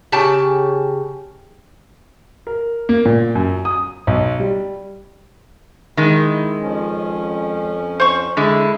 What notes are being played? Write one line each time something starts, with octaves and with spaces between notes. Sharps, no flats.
C#3 G4 A5
A#4
A#3
A#2
F#2
D#6
B1
G3
D#3 G#3 E4
F2 F3 C#4
C5 C#6
D3 G#3 E4